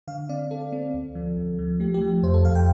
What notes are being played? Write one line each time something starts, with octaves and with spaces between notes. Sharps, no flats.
D3 F5
C4 D5
C4 A4
C4
D2
F3
D2
F3
A3 G4
G4
F3
F2 C5
A4
F2 F5
G5